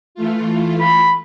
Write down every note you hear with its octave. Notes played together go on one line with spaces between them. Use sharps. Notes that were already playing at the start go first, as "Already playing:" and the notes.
E3 A3 F4
B5